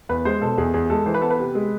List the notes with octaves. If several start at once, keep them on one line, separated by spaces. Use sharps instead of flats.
E2 B4
G#3 C5
B2 A4
E2 G#4
E2 G#4
G#3 A4
E3 C5
B4
B3 A4
B4
C3
G#3